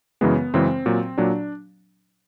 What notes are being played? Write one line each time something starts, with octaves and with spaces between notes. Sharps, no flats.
F#2 C#3 E3 G#3 B3
F#2 C#3 E3 G#3 C4
A#2 F#3
A#2 F#3 D4